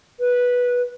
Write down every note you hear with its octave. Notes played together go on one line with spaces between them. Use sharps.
B4